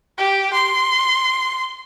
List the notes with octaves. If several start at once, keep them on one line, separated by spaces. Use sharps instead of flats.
G4
C6